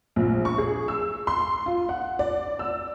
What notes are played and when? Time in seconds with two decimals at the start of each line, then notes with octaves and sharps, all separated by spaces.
0.16 A#1
0.45 C#6
0.58 G#4
0.88 E6
1.27 C6
1.66 F4
1.89 F#5
2.19 D5
2.59 E6